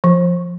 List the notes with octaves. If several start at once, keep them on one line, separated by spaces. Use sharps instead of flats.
F3